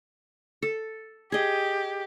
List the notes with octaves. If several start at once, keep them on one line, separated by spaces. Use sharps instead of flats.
A4
G4 G#4 D#5